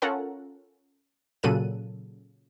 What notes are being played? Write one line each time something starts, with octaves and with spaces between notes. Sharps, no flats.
C#4 F4 A4 A#4 F#5 A#5
A#2 C#3 F#3 A4 F#6 D#7